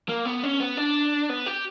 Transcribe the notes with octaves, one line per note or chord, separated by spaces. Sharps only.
A#3
B3
C#4
B3
D4
B3
G4